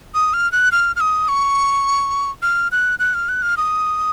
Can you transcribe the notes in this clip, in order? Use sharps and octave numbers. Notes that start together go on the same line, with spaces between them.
D#6
F6
F#6
F6
F6
D#6
C#6
F6
F#6
F#6
F6
F#6
F6
D#6